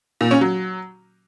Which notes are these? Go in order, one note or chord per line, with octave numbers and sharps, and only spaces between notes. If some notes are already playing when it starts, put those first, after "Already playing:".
A#2
C#4
F#3